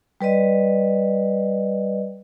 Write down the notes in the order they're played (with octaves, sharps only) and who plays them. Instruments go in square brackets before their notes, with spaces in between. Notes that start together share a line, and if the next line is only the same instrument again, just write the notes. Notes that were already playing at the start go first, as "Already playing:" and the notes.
[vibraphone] G3 B4 D5 D#5